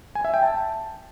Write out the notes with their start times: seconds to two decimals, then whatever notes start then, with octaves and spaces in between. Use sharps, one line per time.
0.15 G#5
0.25 E5
0.34 G5
0.43 A5